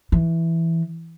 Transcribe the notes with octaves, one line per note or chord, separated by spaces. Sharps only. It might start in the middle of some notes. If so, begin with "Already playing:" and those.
E3